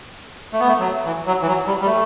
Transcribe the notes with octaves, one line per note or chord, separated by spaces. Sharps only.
A3
B3
A3
F#3
E3
F#3
E3
F#3
G3
G3
A3